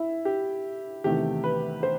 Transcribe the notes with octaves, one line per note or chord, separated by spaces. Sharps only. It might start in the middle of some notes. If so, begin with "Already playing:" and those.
Already playing: E4
G4
E2 C3 D#3 A3 G4
B4
C5